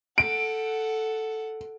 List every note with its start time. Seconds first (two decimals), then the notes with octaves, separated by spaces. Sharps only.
0.18 A4 F#5 D7